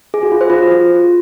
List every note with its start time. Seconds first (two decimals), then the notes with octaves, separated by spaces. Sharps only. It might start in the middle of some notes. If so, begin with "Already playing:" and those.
0.14 G#4
0.23 F#4
0.32 F4
0.41 C5
0.50 F4